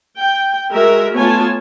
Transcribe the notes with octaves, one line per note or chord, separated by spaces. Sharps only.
G5
G#3 F#4 A#4 E5
A3 B3 F4 C#5 G#5 A5